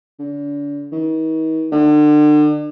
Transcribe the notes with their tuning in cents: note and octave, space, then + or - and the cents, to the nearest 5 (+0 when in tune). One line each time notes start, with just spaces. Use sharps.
D3 -35
D#3 +40
D3 +35